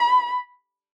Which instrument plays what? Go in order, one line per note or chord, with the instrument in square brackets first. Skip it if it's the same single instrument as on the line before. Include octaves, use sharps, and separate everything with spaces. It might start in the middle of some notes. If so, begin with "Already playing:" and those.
Already playing: [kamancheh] B5